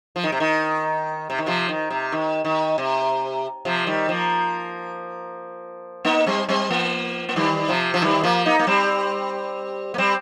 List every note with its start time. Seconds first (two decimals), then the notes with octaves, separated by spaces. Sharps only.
0.16 F3
0.24 D#3
0.32 C3
0.40 D#3
1.30 C3
1.38 D#3
1.46 C3 F3
1.69 D#3
1.91 C3
2.12 D#3
2.45 D#3
2.78 C3
3.65 C3 F3
3.87 D#3 G3
4.09 F3 A#3
6.05 A#3 D#4
6.26 G3 C4
6.49 G3 C4
6.70 F3 A#3
7.29 A#3
7.36 D#3 G3
7.68 C3 F3
7.94 F3
8.02 D#3 G3
8.23 F3 A#3
8.46 A#3 D#4
8.59 A#3
8.67 G3 C4
9.94 A#3
9.98 G3 C4